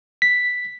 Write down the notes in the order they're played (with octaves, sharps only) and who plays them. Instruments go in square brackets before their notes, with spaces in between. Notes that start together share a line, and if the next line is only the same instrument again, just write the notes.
[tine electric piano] B6